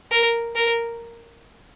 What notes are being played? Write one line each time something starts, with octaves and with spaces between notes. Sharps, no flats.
A#4
A#4